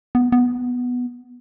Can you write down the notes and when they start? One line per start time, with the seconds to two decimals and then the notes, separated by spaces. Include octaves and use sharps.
0.15 B3
0.32 B3